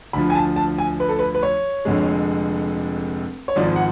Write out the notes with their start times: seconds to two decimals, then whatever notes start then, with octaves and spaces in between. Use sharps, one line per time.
0.13 D2 D3 F3 B5
0.30 G#5
0.35 A5
0.56 A5
0.78 G#5
1.00 B4
1.09 A4
1.19 B4
1.35 B4
1.43 C#5
1.85 F1 F2 D3 G#3
3.48 C#5
3.56 G#1 G#2 F3 D5
3.76 F#5